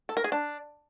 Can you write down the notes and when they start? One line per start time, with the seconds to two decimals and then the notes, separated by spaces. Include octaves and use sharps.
0.09 A4
0.17 A#4
0.24 G#4
0.32 D4